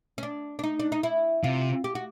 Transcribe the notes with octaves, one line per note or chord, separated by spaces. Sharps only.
C#4
D4
D4
D#4
D4
D#4
E4
C3 F4
G4
F#4